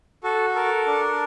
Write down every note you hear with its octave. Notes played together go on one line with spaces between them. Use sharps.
F#4 A4
A4 A#4
D4